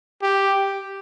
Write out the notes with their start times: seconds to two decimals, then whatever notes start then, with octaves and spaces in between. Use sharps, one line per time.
0.22 G4